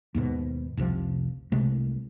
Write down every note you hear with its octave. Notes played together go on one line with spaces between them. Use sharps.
D#2 G#2 B2
F1 C2 C3 F3
C2 C3 G#3 A3